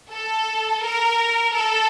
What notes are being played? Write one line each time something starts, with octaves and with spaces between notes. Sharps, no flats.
A4
A#4
A4